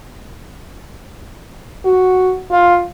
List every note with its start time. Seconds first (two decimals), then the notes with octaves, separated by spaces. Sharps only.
1.85 F#4
2.51 F4